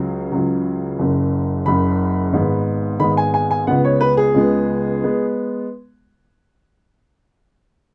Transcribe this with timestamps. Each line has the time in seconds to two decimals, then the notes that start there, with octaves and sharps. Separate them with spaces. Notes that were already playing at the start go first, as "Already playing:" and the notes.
Already playing: C#2 C#3 F#3
0.32 C#2 C#3 F#3
0.99 F#1 F#2 C#3
1.66 F#1 F#2 C#3 B5
2.33 G#1 G#2 G#3 B3
3.00 G#1 G#2 G#3 B3 B5
3.17 G#5
3.34 G#5
3.51 G#5
3.67 C#2 C#3 G#3 B3 F#5
3.85 C#5
4.01 B4
4.17 G#4
4.34 C#2 C#3 G#3 B3
5.04 G#3 B3